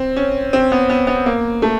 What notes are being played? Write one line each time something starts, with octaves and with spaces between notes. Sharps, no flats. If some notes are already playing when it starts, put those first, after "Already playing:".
Already playing: C4
C#4
C4
B3
B3
B3
A#3
A3